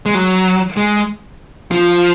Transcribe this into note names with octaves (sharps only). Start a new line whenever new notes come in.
G#3
F#3
G#3
F3